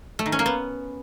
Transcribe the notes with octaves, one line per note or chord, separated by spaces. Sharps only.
A3
D#3
C#4
A#3
B3